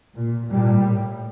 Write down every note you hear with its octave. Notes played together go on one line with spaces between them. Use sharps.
A#2
A#2 G3
A2